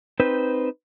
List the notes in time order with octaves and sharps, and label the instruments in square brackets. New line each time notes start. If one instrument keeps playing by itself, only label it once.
[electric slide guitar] C4 D#4 B4 C5